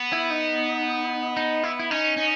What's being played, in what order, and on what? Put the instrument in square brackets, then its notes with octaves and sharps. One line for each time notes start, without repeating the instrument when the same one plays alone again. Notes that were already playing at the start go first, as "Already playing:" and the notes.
Already playing: [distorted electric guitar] B3
[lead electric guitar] E4
D#4
D#4
E4
E4
[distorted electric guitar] C#4 [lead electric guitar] D#4
[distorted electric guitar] C#4